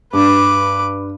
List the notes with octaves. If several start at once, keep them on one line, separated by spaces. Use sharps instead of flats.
G2 B4 D6